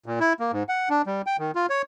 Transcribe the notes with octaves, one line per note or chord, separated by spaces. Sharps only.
A#2
E4
A#3
G#2
F#5
D4
G3
G5
D#3
F4
C#5